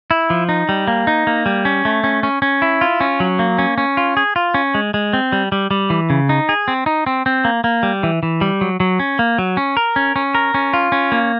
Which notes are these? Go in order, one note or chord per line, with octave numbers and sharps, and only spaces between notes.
E4
F3
D#4
G3
A#3
D#4
A#3
G3
C#4
A3
C#4
C#4
C#4
E4
F4
C#4
F#3
A#3
C#4
C#4
F4
G#4
F4
C#4
G#3
G#3
C4
G3
G3
G3
E3
C#3
D#4
G#4
C4
D#4
C4
C4
A#3
A#3
G3
E3
E3
G3
F#3
F#3
C#4
A#3
F#3
C#4
A#4
C#4
C#4
A#4
C#4
F4
C#4
A#3